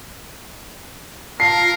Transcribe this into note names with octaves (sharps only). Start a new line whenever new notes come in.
F4 A#4 A5 C7